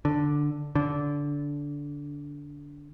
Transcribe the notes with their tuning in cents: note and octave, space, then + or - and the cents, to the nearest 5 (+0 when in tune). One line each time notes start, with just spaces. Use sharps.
D3 +0
D3 -20